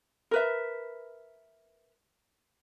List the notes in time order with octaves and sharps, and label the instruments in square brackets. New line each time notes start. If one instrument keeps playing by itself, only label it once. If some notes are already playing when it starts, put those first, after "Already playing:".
[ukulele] A#4 B4 E5